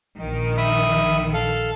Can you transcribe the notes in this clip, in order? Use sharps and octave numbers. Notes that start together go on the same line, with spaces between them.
A#1 D#3
E5 B5 D#6
A4 F5